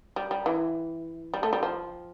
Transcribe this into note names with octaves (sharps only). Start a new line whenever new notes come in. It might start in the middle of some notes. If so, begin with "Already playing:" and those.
G3
G3
E3
G3
A3
G3
F3